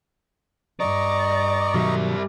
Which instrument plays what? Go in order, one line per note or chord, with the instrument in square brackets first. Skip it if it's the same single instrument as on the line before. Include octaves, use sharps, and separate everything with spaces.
[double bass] G2 [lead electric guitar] D5 [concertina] D#5 A#5 C#6
[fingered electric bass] B2 D#3 F#3 [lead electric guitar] G3 E5